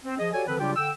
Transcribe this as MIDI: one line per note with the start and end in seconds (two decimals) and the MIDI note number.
0.04 0.18 60
0.19 0.32 53
0.19 0.32 68
0.19 0.32 75
0.33 0.45 66
0.33 0.45 67
0.33 0.45 69
0.33 0.45 73
0.33 0.45 74
0.33 0.45 80
0.47 0.59 50
0.47 0.59 51
0.47 0.59 53
0.47 0.59 60
0.47 0.59 69
0.47 0.59 71
0.60 0.72 49
0.60 0.72 54
0.60 0.72 55
0.60 0.72 62
0.60 0.72 65
0.60 0.72 67
0.76 0.90 50
0.76 0.90 79
0.76 0.90 88